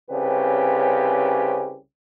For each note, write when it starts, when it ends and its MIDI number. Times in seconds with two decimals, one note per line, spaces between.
0.11 1.76 36
0.11 1.76 49
0.11 1.76 60
0.11 1.76 61
0.11 1.76 67
0.11 1.76 71